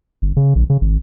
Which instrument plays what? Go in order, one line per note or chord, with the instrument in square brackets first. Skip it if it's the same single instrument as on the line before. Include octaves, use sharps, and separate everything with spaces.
[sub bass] G1
C#3
A#1
C#3
G#1